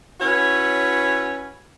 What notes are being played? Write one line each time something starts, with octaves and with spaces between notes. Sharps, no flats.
C#4 E4 F#4 B4 C#5